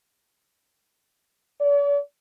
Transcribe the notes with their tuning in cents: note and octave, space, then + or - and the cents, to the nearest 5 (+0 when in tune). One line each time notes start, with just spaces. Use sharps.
D5 -45